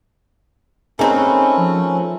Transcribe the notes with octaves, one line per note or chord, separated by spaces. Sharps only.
A3 C4 C#4 D#4 G#4 A#4 B4
F3